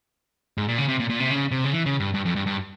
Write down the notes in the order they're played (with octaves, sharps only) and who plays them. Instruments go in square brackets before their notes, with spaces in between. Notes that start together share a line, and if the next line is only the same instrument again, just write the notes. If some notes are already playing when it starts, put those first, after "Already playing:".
[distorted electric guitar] G#2
A#2
C#3
C3
A#2
A#2
C3
C#3
C3
C#3
E3
C#3
G2
G2
F2
G2
G2